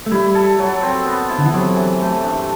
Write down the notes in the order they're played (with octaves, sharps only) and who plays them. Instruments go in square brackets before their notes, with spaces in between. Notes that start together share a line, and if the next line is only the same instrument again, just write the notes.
[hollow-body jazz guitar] A3
[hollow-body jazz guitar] G3 [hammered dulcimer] E4
[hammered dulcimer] A4
F#3
C4
B3
E4
[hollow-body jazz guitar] D3
E3
[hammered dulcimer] C3 [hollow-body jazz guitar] F#3
[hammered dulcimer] E3
A3
G2